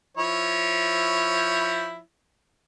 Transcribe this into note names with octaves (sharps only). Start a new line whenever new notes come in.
F3 E4 C#5